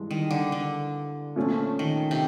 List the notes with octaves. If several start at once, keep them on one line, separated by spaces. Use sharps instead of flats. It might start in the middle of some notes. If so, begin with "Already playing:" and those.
Already playing: G2 E3 G#3
D#3
D3
D3
A#2 F3 A3 C#4
D#3
C3